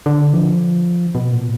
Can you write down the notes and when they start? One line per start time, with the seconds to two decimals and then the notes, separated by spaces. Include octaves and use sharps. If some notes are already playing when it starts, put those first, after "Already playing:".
0.06 D3
0.33 F3
1.15 B2
1.32 A#2